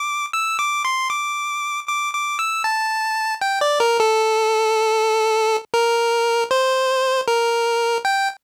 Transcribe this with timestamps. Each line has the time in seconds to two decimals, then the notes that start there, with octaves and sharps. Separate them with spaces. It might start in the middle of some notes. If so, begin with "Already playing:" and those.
Already playing: D6
0.33 E6
0.59 D6
0.85 C6
1.10 D6
1.88 D6
2.13 D6
2.39 E6
2.64 A5
3.41 G5
3.61 D5
3.80 A#4
4.00 A4
5.74 A#4
6.51 C5
7.28 A#4
8.05 G5